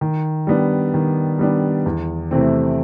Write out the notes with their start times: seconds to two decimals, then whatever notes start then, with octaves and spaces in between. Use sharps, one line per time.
0.01 D#3
0.47 G3 B3 D4
0.94 D#3
1.39 G3 B3 D4
1.86 E2
2.31 C3 E3 A3 C4